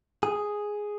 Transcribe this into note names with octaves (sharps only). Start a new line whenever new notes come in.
G#4